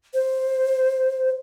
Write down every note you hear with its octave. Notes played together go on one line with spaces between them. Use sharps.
C5